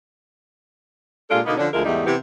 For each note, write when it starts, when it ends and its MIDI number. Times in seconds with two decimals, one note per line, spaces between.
1.30 1.41 46
1.30 1.41 56
1.30 1.41 62
1.30 1.41 65
1.30 1.41 67
1.30 1.41 69
1.46 1.57 47
1.46 1.57 50
1.46 1.57 58
1.46 1.57 59
1.46 1.57 63
1.58 1.67 50
1.58 1.67 53
1.58 1.67 61
1.58 1.67 62
1.73 1.81 38
1.73 1.81 53
1.73 1.81 56
1.73 1.81 64
1.73 1.81 65
1.73 1.81 70
1.85 2.04 40
1.85 2.04 44
1.85 2.04 55
1.85 2.04 57
1.85 2.04 63
2.06 2.16 48
2.06 2.16 52
2.06 2.16 59
2.06 2.16 60
2.06 2.16 64
2.06 2.16 67